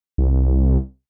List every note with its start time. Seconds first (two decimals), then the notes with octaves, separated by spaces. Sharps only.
0.18 C2